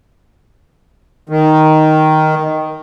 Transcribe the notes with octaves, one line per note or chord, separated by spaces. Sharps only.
D#3